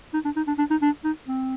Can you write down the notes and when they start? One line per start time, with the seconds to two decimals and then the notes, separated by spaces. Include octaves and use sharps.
0.14 D#4
0.25 D4
0.36 D#4
0.47 D4
0.58 D4
0.70 D#4
0.82 D4
1.04 D#4
1.28 C4